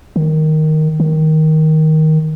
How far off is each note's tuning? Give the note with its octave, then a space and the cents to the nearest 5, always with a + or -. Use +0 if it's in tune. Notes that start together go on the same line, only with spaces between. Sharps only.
D#3 +0
D#3 +10